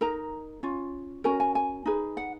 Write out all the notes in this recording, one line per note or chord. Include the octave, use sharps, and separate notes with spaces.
D#4 A#4 A#5
C#4 F4
C#4 F#4 A#4 G#5
G#5
G#5
D#4 G#4 B4
F#5